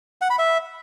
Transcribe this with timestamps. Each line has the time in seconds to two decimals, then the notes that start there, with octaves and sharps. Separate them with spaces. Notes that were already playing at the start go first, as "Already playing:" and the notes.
0.21 F#5
0.30 B5
0.39 E5